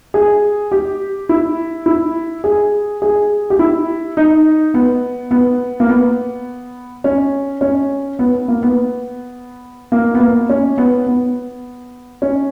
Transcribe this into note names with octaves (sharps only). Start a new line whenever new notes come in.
G#4
G4
E4
E4
G#4
G#4
G4
E4
D#4
B3
B3
A#3
B3
C#4
C#4
B3
A#3
B3
A#3
B3
A#3
C#4
B3
B3
C#4